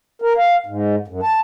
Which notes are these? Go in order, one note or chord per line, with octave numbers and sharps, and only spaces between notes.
A#4
F5
G#2
F#2
A5